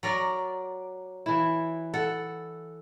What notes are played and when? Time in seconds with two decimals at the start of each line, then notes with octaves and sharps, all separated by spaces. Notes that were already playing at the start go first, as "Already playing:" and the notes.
0.03 F#3 A#4 D5
1.26 E3 E4
1.94 A4 F#5